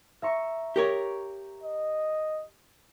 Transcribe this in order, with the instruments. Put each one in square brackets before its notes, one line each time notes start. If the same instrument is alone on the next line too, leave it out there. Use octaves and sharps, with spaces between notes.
[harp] E5 A#5 C#6
[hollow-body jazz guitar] G4 A#4 C#5
[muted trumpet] D#5